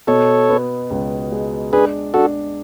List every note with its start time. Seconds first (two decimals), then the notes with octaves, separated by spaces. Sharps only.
0.07 B2 A4 C#5
0.49 B3
0.90 C#2
1.32 G#3
1.72 D4 G#4 B4
2.14 D4 F#4 A4